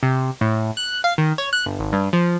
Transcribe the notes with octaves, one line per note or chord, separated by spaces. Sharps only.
C3
A2
F#6
F5
D#3
C#5
F#6
G1
G#1
G2
F3